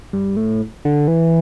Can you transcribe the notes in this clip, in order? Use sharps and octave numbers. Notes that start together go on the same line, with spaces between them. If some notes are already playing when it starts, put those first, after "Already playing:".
G2
A2
D3
E3